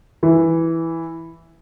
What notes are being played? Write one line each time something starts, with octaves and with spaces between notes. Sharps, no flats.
E3